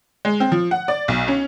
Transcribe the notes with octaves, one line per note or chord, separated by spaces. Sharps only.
G#3
C4
F3
F#5
D5
B1
C#4